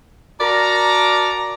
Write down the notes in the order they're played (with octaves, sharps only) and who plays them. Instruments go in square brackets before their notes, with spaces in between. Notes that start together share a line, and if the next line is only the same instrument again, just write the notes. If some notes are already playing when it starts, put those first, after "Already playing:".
[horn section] F#4 A#4 D5 A5 A#5